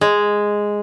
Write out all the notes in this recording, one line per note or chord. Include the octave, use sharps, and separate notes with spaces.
G#3